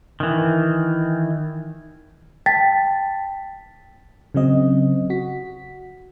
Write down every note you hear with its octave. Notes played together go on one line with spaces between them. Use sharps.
D#3 E3
G5 A5 A6 B6
C#3 F#3 C4 D#5
F#4 B6